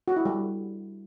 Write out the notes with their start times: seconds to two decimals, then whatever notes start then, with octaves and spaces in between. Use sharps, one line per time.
0.08 F#4
0.17 E4
0.25 G3